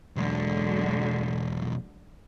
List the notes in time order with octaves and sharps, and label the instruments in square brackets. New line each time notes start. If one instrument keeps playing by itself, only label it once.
[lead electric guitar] B1 E2 [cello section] D3 F#3 G#3